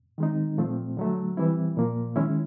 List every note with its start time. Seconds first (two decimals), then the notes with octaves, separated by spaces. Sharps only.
0.18 D#3 G#3 C4 D#4
0.58 A#2 F3 A3 C4
0.97 D3 F#3 A3
1.37 E3 G3 C4 E4
1.77 A#2 F3 A#3
2.16 D#3 G#3 C#4 E4